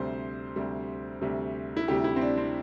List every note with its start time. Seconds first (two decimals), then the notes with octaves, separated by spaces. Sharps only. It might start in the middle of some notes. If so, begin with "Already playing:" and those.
Already playing: D2 C3 G3 C5
0.56 D2 C3 G3
1.22 D2 C3 G3
1.77 E4
1.88 D2 C3 G3 G4
2.04 E4
2.16 C4
2.21 D4
2.37 C4